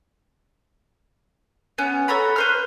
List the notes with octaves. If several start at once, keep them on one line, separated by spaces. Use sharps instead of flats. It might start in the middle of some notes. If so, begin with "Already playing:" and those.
B3 C#4
A4 C#5 A#5 B5
B4 C5 F6